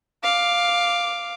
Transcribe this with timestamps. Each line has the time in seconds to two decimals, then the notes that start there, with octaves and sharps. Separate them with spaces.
0.23 F5 D6